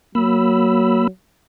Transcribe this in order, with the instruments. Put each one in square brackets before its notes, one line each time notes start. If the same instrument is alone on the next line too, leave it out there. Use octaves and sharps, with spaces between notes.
[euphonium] F#3 [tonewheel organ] A#3 B5 E6